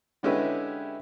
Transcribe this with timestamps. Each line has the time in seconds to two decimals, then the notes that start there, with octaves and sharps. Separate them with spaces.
0.23 D3 G#3 C#4 E4 G4 B4